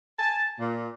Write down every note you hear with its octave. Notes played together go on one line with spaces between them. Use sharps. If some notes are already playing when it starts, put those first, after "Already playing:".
G#5 A5
A#2